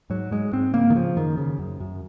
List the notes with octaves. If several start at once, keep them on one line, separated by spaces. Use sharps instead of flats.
G#2 F#3
G#2 G#3
G#2 C4
C#3 A#3
D#3
C#3 F3
F#2 D#3
C#3
F#2
F#2